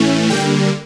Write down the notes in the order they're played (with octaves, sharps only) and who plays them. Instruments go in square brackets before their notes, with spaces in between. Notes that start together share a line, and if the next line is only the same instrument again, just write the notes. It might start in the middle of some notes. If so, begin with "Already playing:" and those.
Already playing: [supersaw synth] A2 E3 A3 C#4
D3 G3 A#3 G5